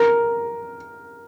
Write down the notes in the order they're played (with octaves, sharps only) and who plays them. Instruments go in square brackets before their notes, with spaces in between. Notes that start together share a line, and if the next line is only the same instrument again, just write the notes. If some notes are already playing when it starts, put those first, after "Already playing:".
Already playing: [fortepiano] A#4